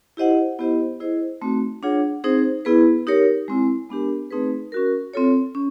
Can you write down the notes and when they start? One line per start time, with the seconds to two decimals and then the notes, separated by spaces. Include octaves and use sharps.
0.17 E4 G4 C5 D#5 F#5
0.59 B3 E4 G4 C5 D#5
1.00 E4 G#4 C5 D#5
1.42 A3 C4 D#4 F#4
1.83 D4 F4 G#4 C#5 F#5
2.24 C4 D#4 G#4 C5
2.65 B3 E4 G#4 B4
3.07 D#4 G4 A#4 C#5
3.48 G#3 C4 E4
3.89 G#3 B3 D4 G4 A#4
4.31 A3 C4 D#4 G#4 B4
4.72 C#4 F#4 A#4
5.14 C4 F4 A4 C#5
5.55 C#4